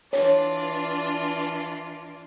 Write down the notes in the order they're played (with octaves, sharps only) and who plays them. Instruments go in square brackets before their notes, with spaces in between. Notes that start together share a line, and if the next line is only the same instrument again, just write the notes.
[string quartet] E3 D4 F4 [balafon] C#5